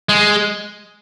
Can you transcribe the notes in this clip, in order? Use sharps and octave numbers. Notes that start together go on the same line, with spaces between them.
G#3